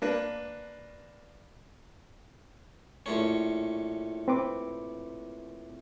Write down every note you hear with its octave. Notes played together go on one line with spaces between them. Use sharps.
A#3 D4 B4
A#1 A2 C#4
C4 B4 D6